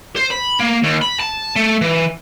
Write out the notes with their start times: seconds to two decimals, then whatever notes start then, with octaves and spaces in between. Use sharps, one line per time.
0.16 C5
0.31 B5
0.60 A#3
0.83 D#2
1.02 B5
1.20 A5
1.56 A3
1.81 E3